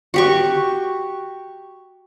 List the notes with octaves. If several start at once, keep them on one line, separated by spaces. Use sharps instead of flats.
F#4 G4 C#6